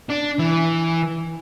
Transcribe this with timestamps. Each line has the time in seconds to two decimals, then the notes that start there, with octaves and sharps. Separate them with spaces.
0.10 D4
0.39 E3